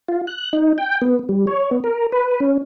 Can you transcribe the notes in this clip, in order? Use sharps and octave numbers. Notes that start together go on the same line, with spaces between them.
F4
F#6
D#4
G5
B3
G3
C#5
B3
A#4
B4
C#4